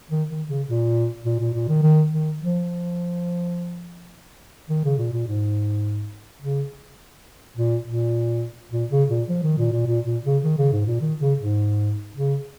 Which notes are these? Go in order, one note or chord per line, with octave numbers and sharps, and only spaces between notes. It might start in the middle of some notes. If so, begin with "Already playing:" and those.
D#3
D#3
C#3
A#2
A#2
A#2
A#2
D#3
D#3
D#3
F3
D#3
C#3
A#2
A#2
G#2
C#3
A#2
A#2
A#2
C#3
A#2
F3
D#3
A#2
A#2
A#2
A#2
C#3
D#3
C#3
G#2
A#2
D#3
C#3
G#2
C#3